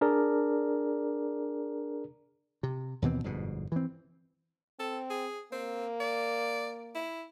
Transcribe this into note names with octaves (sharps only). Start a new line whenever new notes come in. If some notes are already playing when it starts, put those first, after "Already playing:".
D4 G#4 A#4 D5
C3
D#2 B2 E3 C4
G1 F2 G#2 B2
E3 C4
C4 A4
G#4
A#3 C4
D5
E4